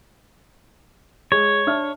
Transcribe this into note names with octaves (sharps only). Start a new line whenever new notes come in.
G#3 C#5
D4 E5 F6